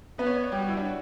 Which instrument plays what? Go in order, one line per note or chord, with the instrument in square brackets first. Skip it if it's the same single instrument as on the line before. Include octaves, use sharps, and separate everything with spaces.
[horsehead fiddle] B3 [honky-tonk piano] B4
[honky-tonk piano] C#5
D5
C#5
[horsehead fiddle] G3 [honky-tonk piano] G4
[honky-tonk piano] F#4
E4
D4
F#4